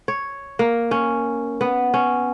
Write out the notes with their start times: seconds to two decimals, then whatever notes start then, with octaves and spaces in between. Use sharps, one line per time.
0.08 C#5
0.59 A#3
0.91 C#4
1.61 B3
1.94 C#4